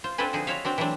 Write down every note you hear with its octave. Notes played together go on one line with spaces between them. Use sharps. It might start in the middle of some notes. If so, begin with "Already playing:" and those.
F4 C5
C4 D4 F4 A4 B4 G#5
D3 F3 D#4 F#4 G#4
F4 F#4 C#5 E5 F5
C4 D4 F#4
E3 F#3 A3 C4 D4